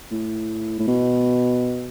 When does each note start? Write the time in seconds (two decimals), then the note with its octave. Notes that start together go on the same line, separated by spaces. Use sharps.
0.11 A2
0.79 A2
0.87 B2